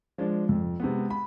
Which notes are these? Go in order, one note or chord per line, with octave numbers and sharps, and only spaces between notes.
F3 G#3 D4
F2
C3 G#3 B3
B5